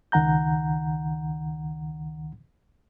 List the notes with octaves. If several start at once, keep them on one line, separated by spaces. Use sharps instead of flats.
C#2 D#3 F#5 A#5 G6